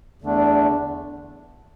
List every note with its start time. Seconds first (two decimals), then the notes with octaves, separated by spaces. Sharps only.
0.22 E2 D3 A3 D4